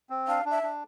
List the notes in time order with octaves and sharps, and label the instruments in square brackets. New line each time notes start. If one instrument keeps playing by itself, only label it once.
[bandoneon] C4
[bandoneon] D4 [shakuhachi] F5
[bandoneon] D4
[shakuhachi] E5
[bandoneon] D4